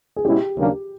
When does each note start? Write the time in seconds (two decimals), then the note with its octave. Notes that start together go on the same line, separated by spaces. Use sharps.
0.16 G#4
0.24 B2 G#3 C#4 E4 G4
0.56 D#2 C#3 F#3 A#3 D4